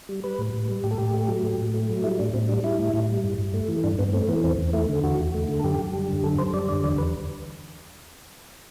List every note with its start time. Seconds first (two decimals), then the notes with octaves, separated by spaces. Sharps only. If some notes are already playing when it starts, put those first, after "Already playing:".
0.09 G3
0.24 G3 B4
0.39 A2
0.54 A2
0.68 G3
0.84 A2 G4
0.91 A4
0.98 A2 G4
1.14 A3
1.28 F#3
1.44 A2
1.58 A2
1.74 A3
1.89 F#3
2.04 G3 E4
2.19 A2 D4
2.34 A2 C4
2.48 G3 D4
2.64 G3 E4
2.79 A2
2.94 A2
3.09 G3
3.24 G2
3.39 G2
3.54 A3
3.68 E3
3.84 G2 D4
3.99 G2 B3
4.13 A3 C4
4.28 E3 B3
4.44 E2 C4
4.59 E2
4.73 A3 E4
4.89 D3
5.03 E2 F#4
5.19 E2
5.34 A3
5.49 D3
5.59 A4
5.64 F#2 G4
5.79 F#2
5.93 G3
6.09 D3
6.24 F#2 A4
6.39 F#2 C5
6.53 G3 D5
6.69 D3 D5
6.84 E2 D5
6.98 E2 B4